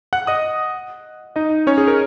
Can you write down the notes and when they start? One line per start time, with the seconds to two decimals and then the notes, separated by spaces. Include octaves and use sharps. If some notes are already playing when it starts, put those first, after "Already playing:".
0.13 F#5 F#6
0.27 D#5 D#6
1.36 D#4 D#5
1.67 C#4 C#5
1.78 G#4
1.87 A#4